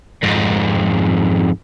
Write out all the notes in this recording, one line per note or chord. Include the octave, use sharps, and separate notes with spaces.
F2 G#2